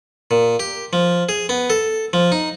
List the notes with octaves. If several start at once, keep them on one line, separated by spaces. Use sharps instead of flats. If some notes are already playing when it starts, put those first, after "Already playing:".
A#2
G4
F3
G#4
B3
A4
F3
D#4